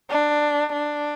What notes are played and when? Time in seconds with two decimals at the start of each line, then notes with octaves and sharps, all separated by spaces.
0.10 D4
0.73 D4